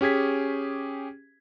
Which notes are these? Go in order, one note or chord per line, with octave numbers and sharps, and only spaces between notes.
C#4 G4 G#4 G#6 B6